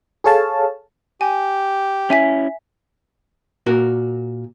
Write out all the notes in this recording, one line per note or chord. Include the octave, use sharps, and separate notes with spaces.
G#4 A4 C#5 F5 A5
G4 G#5
C#4 E4 E5 G#5 B6
A#2 F#4 A#4